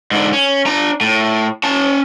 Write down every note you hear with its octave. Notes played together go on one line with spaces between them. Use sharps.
G#2 D3
C#4
D4 A#5
A2
C#4 A5